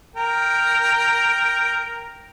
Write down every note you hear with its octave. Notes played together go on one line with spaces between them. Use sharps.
A#4 G5